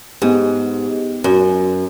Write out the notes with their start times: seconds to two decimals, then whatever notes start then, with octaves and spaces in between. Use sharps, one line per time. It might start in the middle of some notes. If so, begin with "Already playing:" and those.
0.22 G#2 B3 D#4 G4
1.24 F#2